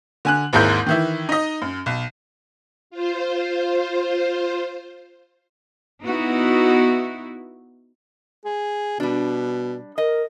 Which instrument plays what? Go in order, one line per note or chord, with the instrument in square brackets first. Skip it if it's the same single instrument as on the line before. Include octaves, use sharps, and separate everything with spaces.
[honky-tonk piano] D3 G#5 F#6
G#1 D#2 G#2 E4 A#4 G6
D#3 E3 E4
D#4 D#5
F#2
B1
[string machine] F4 C5
[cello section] B3 D#4 E4 F#4
[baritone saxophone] G#4
[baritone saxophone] B2 [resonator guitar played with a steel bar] G3 D4
[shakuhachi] A#4 [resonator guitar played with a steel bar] D#5